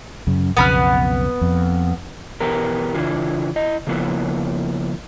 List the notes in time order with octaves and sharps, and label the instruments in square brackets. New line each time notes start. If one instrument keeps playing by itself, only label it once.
[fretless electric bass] F#2 C#3
[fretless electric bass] B1 F2 C#3 [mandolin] B3 B5 F6
[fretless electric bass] F2
[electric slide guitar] B2 E3 B3 G4 A#4
C#3 E3 D4 E4 F4
E4 D#5
C#3 F3 A#3 B3 E4